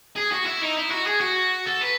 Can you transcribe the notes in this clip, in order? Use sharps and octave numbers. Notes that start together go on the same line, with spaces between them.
G#4
F#4
E4
D#4
E4
F#4
G#4
F#4
A4
B4